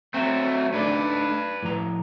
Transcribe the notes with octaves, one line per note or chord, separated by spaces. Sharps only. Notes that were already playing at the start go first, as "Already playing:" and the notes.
F#3 A3 C4 C5
A3 D4 D#4 B4 D5
A2 F3 A#5